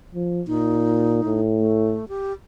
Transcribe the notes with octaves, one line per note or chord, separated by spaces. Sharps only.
F3
A#2 D#4
A2
A3
G4